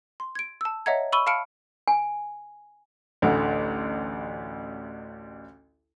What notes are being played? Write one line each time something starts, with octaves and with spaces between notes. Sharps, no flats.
C6
G#6 D7
A5 E6
C#5 D#5 E5 F#5 A#5 G#6
B5 C#6 E6 D#7 G7
F5 A5 B5 F6 C#7 D7
G#5
A1 D2 D3